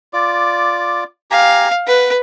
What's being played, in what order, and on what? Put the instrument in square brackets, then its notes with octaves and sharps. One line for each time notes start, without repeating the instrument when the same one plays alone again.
[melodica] F4 D5 D6
[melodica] G4 G#5 A#5 [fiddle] F5
[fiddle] B4 [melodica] F#5